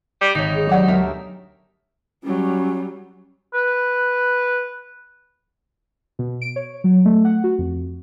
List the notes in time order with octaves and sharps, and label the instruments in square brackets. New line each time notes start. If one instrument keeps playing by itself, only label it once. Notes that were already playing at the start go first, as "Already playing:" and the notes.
[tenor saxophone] G3
[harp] G#1 C#5 [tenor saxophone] D#4
[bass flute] G#4
[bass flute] F#3 [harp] G#3 G4 E7 [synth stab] D5 F#5
[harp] D2 A#4 E5 [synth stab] B2
[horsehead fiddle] F#3 G3 [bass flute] C#4
[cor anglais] B4
[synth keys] B2
D7
C#5
F#3
A3
F#5
F#4
F2